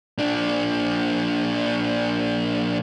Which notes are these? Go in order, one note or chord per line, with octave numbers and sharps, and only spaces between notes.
A#2 D4